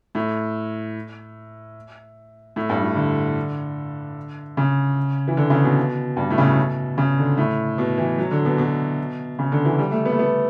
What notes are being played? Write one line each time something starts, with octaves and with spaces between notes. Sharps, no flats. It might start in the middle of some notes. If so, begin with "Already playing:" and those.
A2
A2
G2
A2
D3
C#3
E3
D3
C#3
B2
G2
A2
C#3
B2
C#3
D3
A2
B2
E3
F#3
D3
B2
B2
C#3
D3
E3
G3
A3
B3
A3
B3